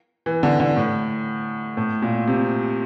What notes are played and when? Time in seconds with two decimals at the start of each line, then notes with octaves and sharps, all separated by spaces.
0.26 E3
0.43 D3
0.60 D3
0.76 A2
1.77 A2
2.02 A#2
2.27 C3